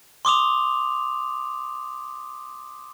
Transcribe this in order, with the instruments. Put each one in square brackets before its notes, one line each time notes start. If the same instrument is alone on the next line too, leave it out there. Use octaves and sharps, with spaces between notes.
[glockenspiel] C6 D6 D#6 F7